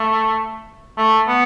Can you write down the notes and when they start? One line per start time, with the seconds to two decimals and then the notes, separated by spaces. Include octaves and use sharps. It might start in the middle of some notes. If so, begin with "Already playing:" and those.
Already playing: A3
0.98 A3
1.28 B3